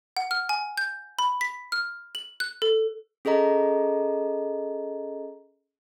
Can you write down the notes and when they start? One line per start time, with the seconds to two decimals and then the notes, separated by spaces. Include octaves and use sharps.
0.17 F#5
0.31 F6
0.49 G#5
0.78 G6
1.19 B5
1.41 B6
1.72 F6
2.15 F#7
2.40 F#6
2.62 A4
3.25 C#4 G#4 A4 D#5 A#5